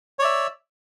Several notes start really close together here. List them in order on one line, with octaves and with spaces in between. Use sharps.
C#5 D5 E5